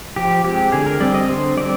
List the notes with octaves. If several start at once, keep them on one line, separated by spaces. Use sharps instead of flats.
F3 G4
G#3 C4 G4
D3 G#4
A#4
G3 C4 D5
D#5
D3 C5
G3 C4 D5